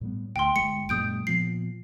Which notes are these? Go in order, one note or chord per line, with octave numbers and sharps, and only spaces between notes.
A2 G3 B3
D2 G5 C6
G1 G#3 C#7
F#2 A#2 G#3 D#6 G6 D7
A#2 F3 B3 C7